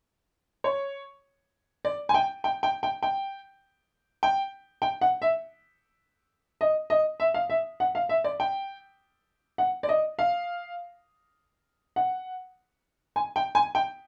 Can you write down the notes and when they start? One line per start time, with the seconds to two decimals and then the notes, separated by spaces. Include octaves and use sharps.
0.64 C#5
1.85 D5
2.09 G#5
2.14 G5
2.44 G5
2.63 G5
2.83 G5
3.03 G5
4.23 G5
4.82 G5
5.01 F#5
5.22 E5
6.61 D#5
6.90 D#5
7.20 E5
7.34 F5
7.50 E5
7.80 F#5
7.95 F5
8.09 E5
8.24 D5
8.40 G5
9.58 F#5
9.83 D5
9.89 D#5
10.19 F5
11.96 F#5
13.16 G#5
13.36 G5
13.55 G#5
13.75 G5